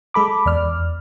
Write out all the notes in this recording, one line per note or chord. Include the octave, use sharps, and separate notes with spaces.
G#3 A4 B5 D6
E2 D5 F6